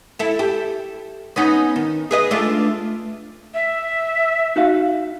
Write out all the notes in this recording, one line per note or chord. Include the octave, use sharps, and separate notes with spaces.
E4 A4
G4 A4
B3 C#4 D#4
D#3
G#4 B4 D#5
A3 D4 F4
E5
D#4 F#4 F5